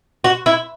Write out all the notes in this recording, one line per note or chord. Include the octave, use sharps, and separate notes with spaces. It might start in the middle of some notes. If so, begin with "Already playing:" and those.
F#4
E4